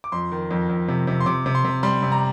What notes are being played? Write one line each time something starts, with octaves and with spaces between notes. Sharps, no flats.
D6
F2 C6
D#3
F2
F2
C3
C3
C6
C3 D6
C3
C6
C3
G3 C6
C3
A#5